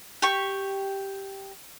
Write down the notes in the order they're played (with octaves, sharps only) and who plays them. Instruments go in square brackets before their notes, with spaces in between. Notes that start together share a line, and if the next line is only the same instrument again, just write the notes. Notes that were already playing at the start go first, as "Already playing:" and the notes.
[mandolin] G4 C#6